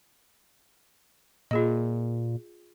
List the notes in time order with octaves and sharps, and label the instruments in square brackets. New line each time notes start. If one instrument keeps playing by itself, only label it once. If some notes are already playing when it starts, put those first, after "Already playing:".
[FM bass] A#2 [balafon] F4 G#4 D#5